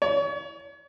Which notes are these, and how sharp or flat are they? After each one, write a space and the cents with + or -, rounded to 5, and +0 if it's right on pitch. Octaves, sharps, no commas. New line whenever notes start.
C#5 +35